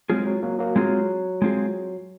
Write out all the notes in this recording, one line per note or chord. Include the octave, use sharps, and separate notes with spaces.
F#3 G#3 C4 F4 G#4
F#3
F#3 A#3
F#3 A#3
F#3 G#3 C4 F4 G#4
G#3 C4 F4 G#4